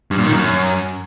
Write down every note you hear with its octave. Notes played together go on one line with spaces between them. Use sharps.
G2
A#2
D#3
F#2